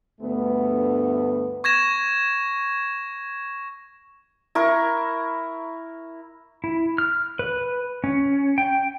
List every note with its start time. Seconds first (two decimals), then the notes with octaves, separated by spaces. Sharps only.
0.21 D2 G2 A3 B3
1.64 C#6 G#6 A#6 E7
4.55 E4 A#4 C#6
6.64 E4
6.98 F6
7.39 B4
8.04 C#4
8.58 G5